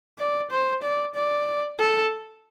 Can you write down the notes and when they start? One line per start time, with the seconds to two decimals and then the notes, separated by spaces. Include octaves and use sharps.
0.19 D5
0.51 C5
0.83 D5
1.15 D5
1.79 A4